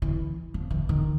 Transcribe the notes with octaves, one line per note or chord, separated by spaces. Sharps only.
E3
F3
E3
D#3